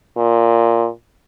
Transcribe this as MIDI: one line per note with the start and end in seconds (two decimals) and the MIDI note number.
0.17 0.88 46